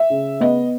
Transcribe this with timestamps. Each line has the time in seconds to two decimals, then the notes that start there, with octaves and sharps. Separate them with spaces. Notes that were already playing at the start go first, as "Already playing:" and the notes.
Already playing: E5
0.10 C#3
0.40 B3 D#5